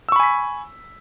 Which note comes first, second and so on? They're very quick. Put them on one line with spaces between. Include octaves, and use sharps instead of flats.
E6 C#6 B5 G#5 B6